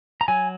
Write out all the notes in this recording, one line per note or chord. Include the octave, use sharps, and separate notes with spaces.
A#5
F#3 G#5